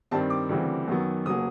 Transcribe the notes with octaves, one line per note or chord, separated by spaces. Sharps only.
G2 D#3 G3 C4 A5
D6
D2 C#3 E3 G3 C4
F#2 D#3 F#3 B3
F1 C#3 F#3 A#3 D#6